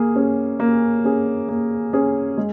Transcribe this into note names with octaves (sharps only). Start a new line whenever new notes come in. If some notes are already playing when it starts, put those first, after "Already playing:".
Already playing: A#3 G#4
C#4 G#4
A#3
C#4 G#4
A#3
C#4 G#4
G#3